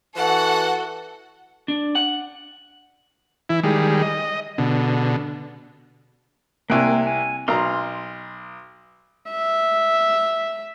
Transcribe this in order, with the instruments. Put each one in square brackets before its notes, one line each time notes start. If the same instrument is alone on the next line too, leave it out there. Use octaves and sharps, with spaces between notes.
[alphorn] E3 [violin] F#4 A4 [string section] F#5
[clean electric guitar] D4
F#5
[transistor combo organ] E3 E4
D#3 G3 G#3
D#5
B2 D3
[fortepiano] C2 F#6 [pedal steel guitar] A#3 G5 G#5
[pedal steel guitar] G#5
[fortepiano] B1 A#5 [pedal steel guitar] C6 F6
[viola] E5